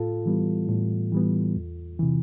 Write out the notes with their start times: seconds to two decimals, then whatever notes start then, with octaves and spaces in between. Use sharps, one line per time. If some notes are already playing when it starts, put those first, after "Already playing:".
Already playing: A2 F4 A4
0.26 E3 G3 B3
0.68 A2
1.12 E3 G3 B3
1.56 E2
1.99 C3 E3